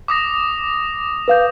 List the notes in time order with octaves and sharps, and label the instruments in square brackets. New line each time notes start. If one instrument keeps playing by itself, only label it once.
[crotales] D6 D#6 A#6
[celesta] B4 F5 G6